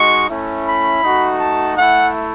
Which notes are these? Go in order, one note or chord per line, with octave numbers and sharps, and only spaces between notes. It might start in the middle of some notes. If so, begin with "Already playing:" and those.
Already playing: G#3 D#4 F#4 C#6
A3 C#4 E4
B5
A3 D#4 F#4
A5
A3 E4 F#5